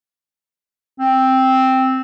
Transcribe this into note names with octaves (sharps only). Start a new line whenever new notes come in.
C4